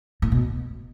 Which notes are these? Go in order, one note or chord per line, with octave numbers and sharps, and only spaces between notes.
A2
B2